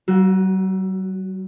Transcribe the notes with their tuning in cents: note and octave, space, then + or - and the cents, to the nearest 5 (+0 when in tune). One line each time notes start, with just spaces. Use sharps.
F#3 +45 F#4 +0